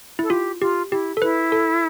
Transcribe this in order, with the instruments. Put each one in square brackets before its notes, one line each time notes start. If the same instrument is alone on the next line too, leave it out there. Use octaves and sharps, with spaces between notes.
[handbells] E4 [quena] A4
[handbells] F4 [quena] G4
[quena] F4 [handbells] G4
[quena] E4 [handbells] G4
[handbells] A4
[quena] E4 [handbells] B4
[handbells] A4